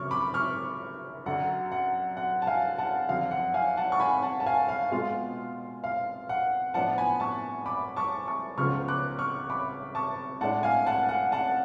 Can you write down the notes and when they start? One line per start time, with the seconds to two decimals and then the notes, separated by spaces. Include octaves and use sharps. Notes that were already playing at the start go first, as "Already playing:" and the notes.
Already playing: F#2 C#3 F3 C#6 D6 F6
0.11 B5 D6
0.34 C#6 F6
1.26 F#2 D3 F#3 F#5
1.72 F#5
2.17 F#5
2.42 A5
2.47 F5 G#5
2.78 F#5 A5
3.09 F2 D3 F#3 F5
3.31 F#5
3.54 F5 G#5
3.77 F#5 A5
3.92 C#6
4.00 G#5 B5
4.23 F#5 A5
4.40 A5
4.46 F5 G#5
4.69 F5
4.91 B2 G#3 B3 F4 F5
5.84 F5
6.29 F#5
6.74 A2 F3 B3 D4 F#5 A5
6.98 G#5 B5
7.20 A5 C#6
7.66 B5 D6
7.96 A5 C#6
8.27 A5 C#6
8.57 C#2 C#3 F3 B3 F4 C#6 F6
8.88 D6 F#6
9.19 C#6 F6
9.50 B5 D6
9.95 A5 C#6
10.41 A2 G#3 D4 F#5 A5
10.63 F5 G#5
10.86 F#5 A5
11.09 F#5
11.32 F#5 A5